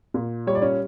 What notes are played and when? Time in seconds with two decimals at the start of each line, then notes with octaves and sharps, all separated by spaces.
0.14 A#2
0.47 G3 C#5
0.55 D5
0.62 C#4 C#5